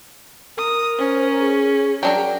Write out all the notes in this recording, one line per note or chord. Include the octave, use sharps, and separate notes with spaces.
A#4 D#6
C#4 C5
G#4
F#3 D4 A#4 G5